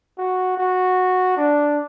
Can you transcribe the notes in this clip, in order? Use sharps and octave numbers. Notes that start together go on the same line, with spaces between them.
F#4
F#4
D4